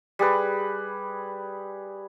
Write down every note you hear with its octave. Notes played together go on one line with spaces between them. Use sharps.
G3 G#4 B4